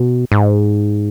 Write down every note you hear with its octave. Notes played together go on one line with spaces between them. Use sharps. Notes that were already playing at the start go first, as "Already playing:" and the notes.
Already playing: B2
G#2